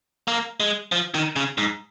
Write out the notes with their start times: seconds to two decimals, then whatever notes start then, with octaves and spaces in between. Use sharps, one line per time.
0.28 A#3
0.60 G#3
0.92 F3
1.15 D#3
1.36 C#3
1.58 G#2